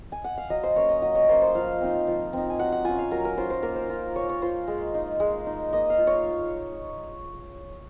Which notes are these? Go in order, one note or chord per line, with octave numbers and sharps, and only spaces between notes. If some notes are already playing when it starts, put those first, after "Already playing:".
Already playing: A#5
G#5
F#5
F5
F#3 D#5
C5
A#3 C#4 C#5
D#5
F#3 D#5
C#5
A#3 C#4 C5
C5
F3 F5
C4 D#4
F3
C4 D#4
G#5
F#3 F#5
F#5
C#4 F4 G#5
F5
F#3 A#4
A#4
C#4 F4 C5
C5
A#3 A#4
C5
F4
A#3 C#5
C#5
F4 C5
G#3
D#4
G#3
D#4
A#3 D#5
F5
F4
C#5